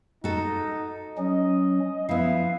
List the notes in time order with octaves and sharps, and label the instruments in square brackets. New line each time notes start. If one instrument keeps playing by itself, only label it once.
[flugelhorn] D#4 [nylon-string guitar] F#4 A4
[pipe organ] F#3 C#4 [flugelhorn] D#5
[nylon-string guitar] F3 B3 [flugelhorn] E4 [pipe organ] F5